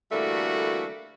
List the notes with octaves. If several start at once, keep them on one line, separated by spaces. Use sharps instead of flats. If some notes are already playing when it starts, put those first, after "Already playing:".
D3 E3 G3 A3 A#3 F#4